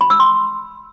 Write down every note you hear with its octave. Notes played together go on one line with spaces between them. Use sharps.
B5
E6
C6